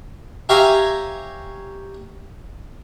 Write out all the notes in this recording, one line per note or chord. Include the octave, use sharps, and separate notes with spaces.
G4 C#5 E5 F5 G#5 A#5